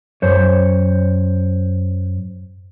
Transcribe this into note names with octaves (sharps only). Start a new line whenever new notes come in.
F#2 C5 C#5